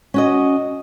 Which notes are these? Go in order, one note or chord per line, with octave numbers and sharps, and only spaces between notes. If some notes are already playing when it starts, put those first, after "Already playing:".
C#4 F#4 D#5